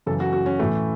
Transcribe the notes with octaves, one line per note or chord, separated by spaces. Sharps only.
F#2 C#3 E3 A4
F#4
F#4
C#4
A2 E3 A3